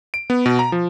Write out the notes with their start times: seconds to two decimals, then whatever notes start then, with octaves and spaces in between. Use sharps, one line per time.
0.14 D7
0.30 B3
0.46 B2
0.59 A#5
0.72 F3